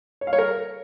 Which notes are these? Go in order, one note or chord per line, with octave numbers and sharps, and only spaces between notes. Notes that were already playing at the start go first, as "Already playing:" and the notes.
C#5
F5
C#5
A#4